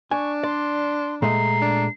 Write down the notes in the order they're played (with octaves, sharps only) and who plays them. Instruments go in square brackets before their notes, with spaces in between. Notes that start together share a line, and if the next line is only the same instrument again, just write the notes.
[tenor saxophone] D4 [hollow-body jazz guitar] G#5 [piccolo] C#6
[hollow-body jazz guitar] D5 [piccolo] C6
[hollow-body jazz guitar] A#2 G#3 A3 [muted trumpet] A#5 [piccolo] C7
[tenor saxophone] D4